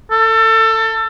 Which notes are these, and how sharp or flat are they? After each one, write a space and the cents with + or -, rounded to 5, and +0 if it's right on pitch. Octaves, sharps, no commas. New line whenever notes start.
A4 +25